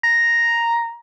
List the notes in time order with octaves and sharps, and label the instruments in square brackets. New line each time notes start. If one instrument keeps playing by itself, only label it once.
[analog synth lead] A#5